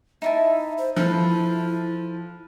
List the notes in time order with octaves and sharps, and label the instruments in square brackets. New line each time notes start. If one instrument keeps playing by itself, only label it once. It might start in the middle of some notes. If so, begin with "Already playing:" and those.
[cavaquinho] D#4 E4 A5 [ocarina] E5
[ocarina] C5
[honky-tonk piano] F3 [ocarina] E4 [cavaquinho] A4 B4 C5